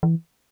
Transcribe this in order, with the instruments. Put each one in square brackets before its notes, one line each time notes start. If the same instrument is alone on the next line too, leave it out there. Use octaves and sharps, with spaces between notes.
[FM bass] E3